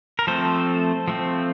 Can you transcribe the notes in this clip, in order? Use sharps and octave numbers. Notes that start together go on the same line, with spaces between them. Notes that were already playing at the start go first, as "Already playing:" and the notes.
A#4
F3 A3 C4 A4 C5
F3 A3 C4